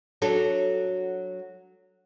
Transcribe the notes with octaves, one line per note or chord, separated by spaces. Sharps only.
F#3 D4 A4